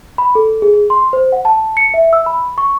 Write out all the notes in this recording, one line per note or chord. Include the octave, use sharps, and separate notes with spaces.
B5
A4
G#4
C6
C5
F#5
A5
C#7
E5
E6
B5
C#6